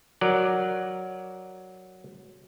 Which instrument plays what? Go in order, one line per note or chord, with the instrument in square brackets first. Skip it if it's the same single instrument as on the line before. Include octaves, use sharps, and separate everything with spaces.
[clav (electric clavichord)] F#3 A#4 D5